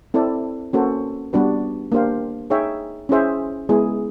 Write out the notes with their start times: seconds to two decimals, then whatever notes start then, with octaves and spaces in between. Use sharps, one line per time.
0.14 C4 E4 A4 D5
0.73 A#3 C#4 F#4 A4 C5
1.33 G3 B3 D4 F#4 B4
1.92 A#3 D4 G4 C5 F5
2.50 D#4 G#4 C#5 E5 G5
3.09 C#4 E4 G#4 C5 E5
3.69 G#3 B3 E4 G#4